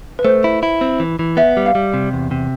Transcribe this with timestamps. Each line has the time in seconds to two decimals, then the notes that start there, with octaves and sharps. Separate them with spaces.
0.19 B4
0.25 A3 C5
0.44 E4
0.63 E4
0.81 C4
1.00 E3
1.19 E3
1.37 B3 E5
1.57 G3
1.66 F5
1.75 G3
1.94 C3
2.13 E2
2.31 C3